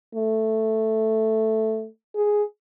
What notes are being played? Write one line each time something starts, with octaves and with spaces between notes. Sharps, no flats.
A3
G#4